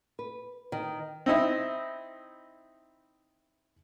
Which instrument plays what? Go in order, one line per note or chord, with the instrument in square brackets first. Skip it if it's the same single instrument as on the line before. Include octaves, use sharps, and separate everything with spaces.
[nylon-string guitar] B4
D#3
[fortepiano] C4 D#4 E4